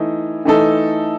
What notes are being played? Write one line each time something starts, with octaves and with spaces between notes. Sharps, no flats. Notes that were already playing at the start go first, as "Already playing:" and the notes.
Already playing: E3 A3 D#4
E3 A3 D#4 A4